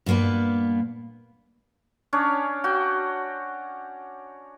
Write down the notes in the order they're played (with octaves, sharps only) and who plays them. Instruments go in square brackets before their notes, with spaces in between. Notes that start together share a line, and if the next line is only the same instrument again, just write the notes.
[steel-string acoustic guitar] G2 A#2 A#3 B3 B4
[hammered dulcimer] C#4 D4 C#5
F#4 G5